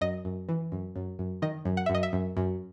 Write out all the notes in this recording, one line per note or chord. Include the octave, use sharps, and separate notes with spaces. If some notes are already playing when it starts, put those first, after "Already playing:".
F#2 D#5
F#2
E3
F#2
F#2
F#2
D#3 D#5
F#2
F#5
F#2 E5
D#5
E5
F#2
F#2